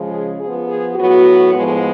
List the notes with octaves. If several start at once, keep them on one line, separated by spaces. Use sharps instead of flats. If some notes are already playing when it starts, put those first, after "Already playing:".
Already playing: C#3 F3 G#3
G#4
F3 B3 G#4
G#4
A2 F#3 B3 F#4
A2 F3 G#3 B3